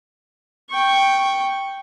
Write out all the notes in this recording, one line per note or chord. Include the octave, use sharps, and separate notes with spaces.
G5 C#6